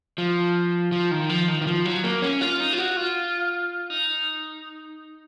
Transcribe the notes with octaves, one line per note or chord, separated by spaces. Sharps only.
F3
F3
D#3
F3
D#3
D#3
F3
F#3
A#3
C#4
F4
D#4
F4
F#4
F4
D#4